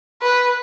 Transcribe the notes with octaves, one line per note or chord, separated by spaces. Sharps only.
B4